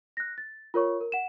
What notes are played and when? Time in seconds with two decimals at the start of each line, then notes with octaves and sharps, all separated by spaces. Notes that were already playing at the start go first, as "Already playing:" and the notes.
0.17 F#6 A#6
0.38 A6
0.74 F4 A#4 C#5 C#6
1.01 A#4
1.12 F#5 E7